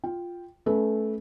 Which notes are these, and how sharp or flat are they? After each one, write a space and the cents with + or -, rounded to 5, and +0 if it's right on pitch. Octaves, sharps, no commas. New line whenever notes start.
F4 +0 G5 +0
A3 -20 C#4 +0 B4 -20